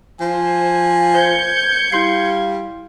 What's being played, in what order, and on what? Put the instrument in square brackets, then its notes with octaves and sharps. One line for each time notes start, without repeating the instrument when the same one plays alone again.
[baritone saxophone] F3 [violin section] C5 [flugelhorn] G#5
[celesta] C5 [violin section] G6 G#6 C#7
[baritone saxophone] G3 [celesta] E4 C6 C7 [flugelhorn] F5